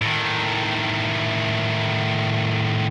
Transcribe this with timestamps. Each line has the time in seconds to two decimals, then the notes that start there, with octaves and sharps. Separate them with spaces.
0.01 A2 D#3